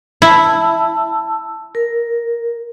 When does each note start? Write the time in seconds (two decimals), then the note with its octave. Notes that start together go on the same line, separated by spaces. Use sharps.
0.22 E4 A5 E6
1.75 A#4